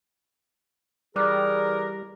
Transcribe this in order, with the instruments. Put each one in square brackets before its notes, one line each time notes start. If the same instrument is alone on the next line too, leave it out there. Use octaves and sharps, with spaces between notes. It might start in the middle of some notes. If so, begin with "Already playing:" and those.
[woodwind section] E3 G#4 A#4 [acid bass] G3 [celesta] D5 D6 F#6